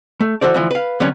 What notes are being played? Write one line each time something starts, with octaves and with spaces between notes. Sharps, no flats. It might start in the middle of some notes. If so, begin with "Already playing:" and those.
A3
E3 F#4 A4 C5 D5
D2 E3 F3
B4 F5
D3 F#3 G3 B3 C#4